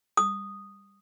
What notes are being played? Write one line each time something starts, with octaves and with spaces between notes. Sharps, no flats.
D#6